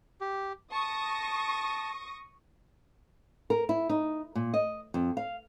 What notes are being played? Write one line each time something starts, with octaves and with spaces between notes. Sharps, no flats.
G4
A5 C#6 D#6 A#6
A#4
E4
D#4
A#2
D#5
F2
F5